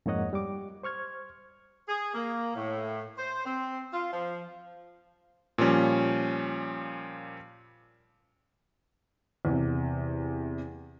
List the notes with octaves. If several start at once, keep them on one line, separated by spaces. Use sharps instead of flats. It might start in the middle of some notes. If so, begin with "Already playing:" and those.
F2 G#2 A#3 C#5 D#5 F#5
G3 D6
C5 C#6 F6 G#6
G#4
A#3
A2
C5
C4
F4
F3
A#2 F3 G3 C#4
E2 C3